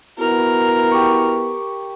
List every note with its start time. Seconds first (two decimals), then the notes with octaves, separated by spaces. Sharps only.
0.19 B3 E4 F#4 A#4
0.91 G4 C#6